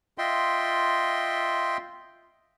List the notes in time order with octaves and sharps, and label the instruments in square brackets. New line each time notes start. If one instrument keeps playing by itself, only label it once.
[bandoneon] F4 D#5 E5 G5 C6